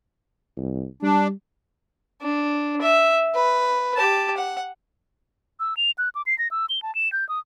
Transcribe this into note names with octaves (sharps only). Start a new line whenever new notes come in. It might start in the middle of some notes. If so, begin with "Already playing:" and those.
C2
G3 D4
D4
E5
B4
G4 A5
F#5
E6
F7
F#6
D6
C7
A#6
E6
G7
A5
E7
G6
D#6